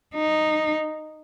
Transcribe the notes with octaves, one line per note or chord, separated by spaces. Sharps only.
D#4